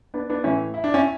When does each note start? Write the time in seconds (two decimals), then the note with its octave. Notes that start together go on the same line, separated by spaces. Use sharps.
0.14 B3 D4
0.30 B3 D4
0.44 A2 E3 C#4 E4
0.74 E4
0.84 D4
0.94 C#4 E4